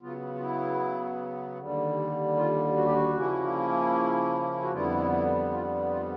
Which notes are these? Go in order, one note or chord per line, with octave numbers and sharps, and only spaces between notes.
C#3 F#3 B3 F4
F4
E4
D#2 D3 G3
F4
F#4
G4
F#4
C#3 F3 A#3 C#4 E4
F#4
F2 D3 G3 B3 E4 F4
E4
F4
F4